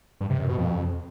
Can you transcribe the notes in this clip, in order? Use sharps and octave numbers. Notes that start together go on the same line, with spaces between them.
G2
C3
F#2
B2
F2